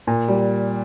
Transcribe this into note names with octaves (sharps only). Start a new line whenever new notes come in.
A#2
G3